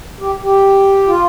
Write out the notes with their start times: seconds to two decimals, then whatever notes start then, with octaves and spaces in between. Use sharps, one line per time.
0.20 G4
0.43 G4
1.07 F4